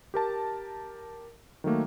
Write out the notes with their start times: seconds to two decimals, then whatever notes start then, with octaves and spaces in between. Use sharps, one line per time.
0.14 G4 A#4 A5
1.64 D#3 F#3 A3 A#3